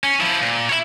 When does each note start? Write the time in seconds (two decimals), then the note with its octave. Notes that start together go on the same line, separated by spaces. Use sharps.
0.04 C#4
0.20 F3 E4
0.41 A#2
0.69 E4 C#5